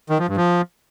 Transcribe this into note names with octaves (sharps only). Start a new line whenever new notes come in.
D#3
F3
G2
F3